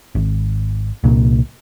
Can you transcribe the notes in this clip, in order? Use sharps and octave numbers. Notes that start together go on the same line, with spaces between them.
G#1
C2 A#2